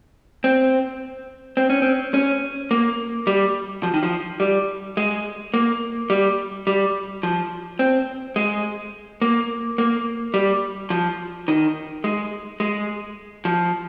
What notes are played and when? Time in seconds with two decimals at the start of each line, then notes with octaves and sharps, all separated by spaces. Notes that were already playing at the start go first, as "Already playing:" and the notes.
0.44 C4
1.57 C4
1.70 C#4
1.82 C4
2.14 C#4
2.71 A#3
3.27 G3
3.83 F3
3.94 D#3
4.03 F3
4.40 G3
4.97 G#3
5.54 A#3
6.10 G3
6.67 G3
7.23 F3
7.79 C4
8.36 G#3
9.22 A#3
9.78 A#3
10.34 G3
10.90 F3
11.48 D#3
12.04 G#3
12.60 G#3
13.45 F3